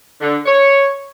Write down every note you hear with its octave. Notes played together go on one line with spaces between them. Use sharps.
D3
C#5